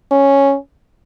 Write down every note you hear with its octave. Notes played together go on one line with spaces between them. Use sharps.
C#4